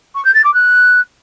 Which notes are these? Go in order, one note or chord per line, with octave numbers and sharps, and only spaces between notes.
C#6
G6
A6
D6
F#6